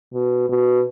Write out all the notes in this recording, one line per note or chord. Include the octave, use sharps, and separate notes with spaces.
B2
B2